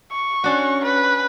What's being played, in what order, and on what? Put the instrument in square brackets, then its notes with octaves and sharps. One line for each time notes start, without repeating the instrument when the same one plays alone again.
[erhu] C#6
[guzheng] C#4 D4 F#4
[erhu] B4